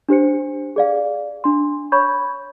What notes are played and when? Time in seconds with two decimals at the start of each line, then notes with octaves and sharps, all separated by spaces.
0.09 D4 G4 C5 C#7
0.76 G#4 D5 F5
1.44 D4 C6
1.92 C#5 B5 C#6 G6 G#6